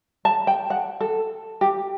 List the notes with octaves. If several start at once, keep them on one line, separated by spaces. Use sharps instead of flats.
A5
G5
F#5
A4
G4